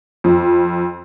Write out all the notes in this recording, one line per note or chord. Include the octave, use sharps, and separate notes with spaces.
F2